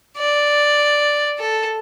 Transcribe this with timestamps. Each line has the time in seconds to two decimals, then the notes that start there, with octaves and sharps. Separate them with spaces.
0.18 D5
1.39 A4